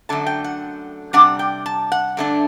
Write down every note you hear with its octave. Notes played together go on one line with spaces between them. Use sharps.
F#2 D3 A3 A5
G5
F#5
C3 G3 D4 F#5
G5
A5
F#5
G2 D3 A3 D4